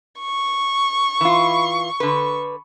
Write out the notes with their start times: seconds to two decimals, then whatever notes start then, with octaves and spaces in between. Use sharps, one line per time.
0.19 C#6
1.21 E3 F4
2.00 D3 B4